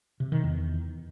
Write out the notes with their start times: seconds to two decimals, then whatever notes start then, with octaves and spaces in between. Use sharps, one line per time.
0.20 C3
0.32 D#3
0.44 E2